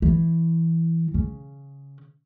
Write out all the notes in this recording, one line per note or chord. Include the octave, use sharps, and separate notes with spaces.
E3
C#3